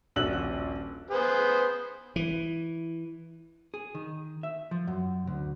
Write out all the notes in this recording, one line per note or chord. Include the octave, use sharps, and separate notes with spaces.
D#1 A#1 F#4 E6 F#6 F#7
B3 G#4 C5
E3
G#4
D#3
E5
F3
F#2
D2